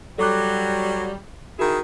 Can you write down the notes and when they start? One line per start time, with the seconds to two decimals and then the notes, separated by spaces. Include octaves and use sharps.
0.18 F#3 G3 A4 D6 F#6
1.59 D#3 E4 F#4 G#4 A#4